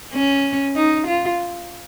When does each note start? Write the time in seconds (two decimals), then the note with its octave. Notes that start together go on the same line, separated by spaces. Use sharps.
0.14 C#4
0.75 D#4
1.07 F4